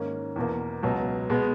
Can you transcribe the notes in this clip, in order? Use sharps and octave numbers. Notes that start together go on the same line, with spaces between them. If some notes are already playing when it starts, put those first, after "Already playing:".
Already playing: G#2 D#3 A#3 C#4
E2 B2 A#3
C#2 B2 F#3
B2 G#3 B3